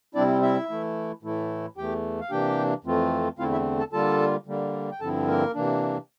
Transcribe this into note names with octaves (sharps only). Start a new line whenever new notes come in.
C3 G3 C4 D4 E4 D5
E4 E5
E3 A3 E4
A2 E3 A3 E4
E2 E3 A3 G4 G5
F5
C3 E3 A#3 D4 G4 G5
F2 E3 A3 C4 F4
E2 D3 A3 C4 E4 F4 F5
E4 E5
A4 A5
D3 G3 A#3 F4 A4 A5
D3 G3 A#3
G5
G2 D3 F3 C4 E4 A4 A5
A#3 A#4
C3 E3 A#3 D4